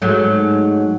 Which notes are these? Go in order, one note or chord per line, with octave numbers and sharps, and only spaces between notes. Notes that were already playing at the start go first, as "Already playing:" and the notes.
G#2 F#3 A3